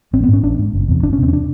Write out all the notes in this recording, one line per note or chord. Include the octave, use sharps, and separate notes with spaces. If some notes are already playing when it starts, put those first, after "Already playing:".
A1 C4
B3
G#2 C#4
A1 D4
G#2
F#1
E2 C3
F#1 D4
C#4
E2 C3 C4
C#4
D4